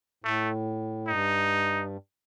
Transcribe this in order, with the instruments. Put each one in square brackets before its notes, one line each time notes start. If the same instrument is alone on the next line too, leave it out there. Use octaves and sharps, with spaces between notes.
[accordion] A2 [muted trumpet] A3
[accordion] G2 [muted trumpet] D#4